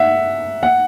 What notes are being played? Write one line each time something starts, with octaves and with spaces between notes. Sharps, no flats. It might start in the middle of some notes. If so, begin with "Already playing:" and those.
Already playing: E5 F#5
F#5